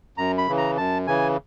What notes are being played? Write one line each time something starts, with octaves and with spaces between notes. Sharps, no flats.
F#2 A#5
B5
C#3 E3
A#5
F#2 A5
C#3 E3 G#5